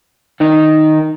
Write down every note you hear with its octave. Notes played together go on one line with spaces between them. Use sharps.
D#3 D#4